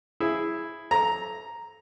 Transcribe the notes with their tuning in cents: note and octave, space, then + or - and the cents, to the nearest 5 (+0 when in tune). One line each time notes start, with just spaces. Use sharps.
E4 +0 G#4 +0
A4 -20 A#5 +0